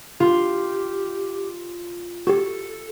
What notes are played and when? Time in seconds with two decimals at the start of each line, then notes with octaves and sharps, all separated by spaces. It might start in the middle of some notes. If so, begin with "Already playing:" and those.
0.20 F4 G4
2.27 F#4 G4 A4